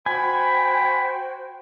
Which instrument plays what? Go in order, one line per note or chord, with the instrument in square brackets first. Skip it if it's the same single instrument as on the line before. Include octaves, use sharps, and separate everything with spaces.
[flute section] F#4 C5 G5 [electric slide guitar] G#5 [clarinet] B5